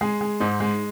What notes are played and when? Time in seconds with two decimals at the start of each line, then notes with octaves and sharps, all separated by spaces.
0.01 G#3 G#4
0.21 G#3
0.40 G#2 D#4
0.60 G#3